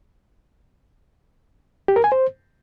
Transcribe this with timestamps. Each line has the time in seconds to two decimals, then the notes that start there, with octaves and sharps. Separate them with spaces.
1.88 G4
1.96 A#4
2.04 G#5
2.12 C5